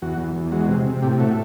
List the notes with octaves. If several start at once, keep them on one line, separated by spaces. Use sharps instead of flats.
E2 F#4
E2
E2
G#3 F#4
C3
C3
A2 G4
A3 F#4